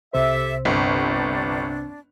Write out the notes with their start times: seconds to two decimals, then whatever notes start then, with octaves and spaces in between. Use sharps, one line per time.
0.13 C2 C3 G4 A4 C5 E5
0.65 G1 C4 D4